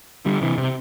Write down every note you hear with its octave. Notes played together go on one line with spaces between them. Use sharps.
D3 G3
C3 E3
C3